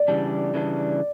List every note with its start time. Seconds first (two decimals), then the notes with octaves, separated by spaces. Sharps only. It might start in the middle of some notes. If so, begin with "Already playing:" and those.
Already playing: D5
0.08 C#3 E3 G3 D4
0.54 C#3 E3 G3 D4